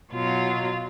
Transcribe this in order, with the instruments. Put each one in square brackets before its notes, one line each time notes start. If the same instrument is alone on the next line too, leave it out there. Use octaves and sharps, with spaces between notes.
[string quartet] B2 F#3 F4